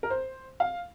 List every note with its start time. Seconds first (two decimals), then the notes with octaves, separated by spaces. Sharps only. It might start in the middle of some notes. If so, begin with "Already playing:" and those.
0.03 A#4
0.10 C5
0.60 F5